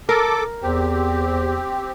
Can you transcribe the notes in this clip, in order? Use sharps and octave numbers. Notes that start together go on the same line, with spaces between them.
A4 A#4 D6
E2 C4 G4